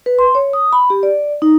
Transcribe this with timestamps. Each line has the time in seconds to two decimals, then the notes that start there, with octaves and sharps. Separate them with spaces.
0.06 B4
0.19 C6
0.35 C#5
0.53 D#6
0.73 B5
0.90 G4
1.03 D5
1.42 D#4